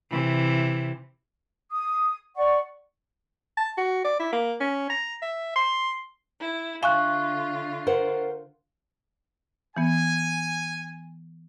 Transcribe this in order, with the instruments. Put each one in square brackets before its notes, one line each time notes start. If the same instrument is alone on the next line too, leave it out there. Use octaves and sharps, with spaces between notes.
[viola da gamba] C3 E3
[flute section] D#6
D5 F#5 C#6
[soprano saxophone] A5
F#4
D5
E4
A#3
C#4
A#5
E5
C6
[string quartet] E4
[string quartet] D3 F4 [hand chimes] E5 C#6 F#6 [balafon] F5 G#5
[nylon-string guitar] A#4 C5 F#5
[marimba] E3 B3 [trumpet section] G#5